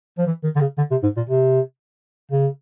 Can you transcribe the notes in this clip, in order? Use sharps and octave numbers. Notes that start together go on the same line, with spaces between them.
F3
E3
D#3
D3
C#3
D3
C3
G#2
A#2
C3
C#3